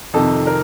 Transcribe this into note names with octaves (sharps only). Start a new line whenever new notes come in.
F2 C3 D#3 A4
A#4